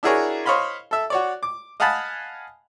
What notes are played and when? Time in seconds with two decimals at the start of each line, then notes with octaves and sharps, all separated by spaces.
0.03 D4 E4 F#4 G#4 A#4 C#5
0.46 C5 C#5 D#5 F5 B5 C6
0.91 A4 E5
1.10 F#4 C#5 D5
1.43 D6
1.80 D#5 F5 F#5 G#5 A5 B5